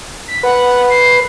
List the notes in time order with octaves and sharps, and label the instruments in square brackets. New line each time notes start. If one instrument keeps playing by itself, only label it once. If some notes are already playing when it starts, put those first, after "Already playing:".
[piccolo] B6
[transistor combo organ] B4 [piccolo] F#5
[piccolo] C7